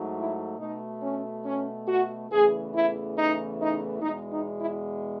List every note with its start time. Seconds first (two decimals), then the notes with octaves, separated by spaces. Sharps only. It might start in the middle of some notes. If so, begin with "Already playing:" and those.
Already playing: G#2 F#3 A3
0.16 E4
0.59 B2 A3 D#4
1.01 C#4
1.44 C#4
1.87 F#4
2.29 E2 C#3 E3 A3 G#4
2.73 E4
3.16 D#4
3.59 D#4
4.01 E2 B2 G#3 D#4
4.31 D#4
4.59 E4